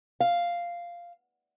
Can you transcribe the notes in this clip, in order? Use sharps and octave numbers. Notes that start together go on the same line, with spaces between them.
F5